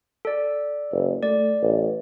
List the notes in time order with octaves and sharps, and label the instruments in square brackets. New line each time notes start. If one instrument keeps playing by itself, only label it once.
[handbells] A4 D5
[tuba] F#1
[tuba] A3 [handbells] D5
[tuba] A1